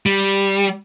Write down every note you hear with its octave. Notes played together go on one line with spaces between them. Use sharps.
G3